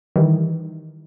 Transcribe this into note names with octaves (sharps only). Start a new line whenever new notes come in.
D#3 E3 G3